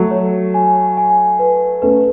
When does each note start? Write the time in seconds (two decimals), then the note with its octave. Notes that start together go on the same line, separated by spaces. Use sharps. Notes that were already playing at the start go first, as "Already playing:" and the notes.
Already playing: F#3 A3
0.11 C#5
0.54 G#5
0.97 G#5
1.39 B4
1.82 A3 C#4 B4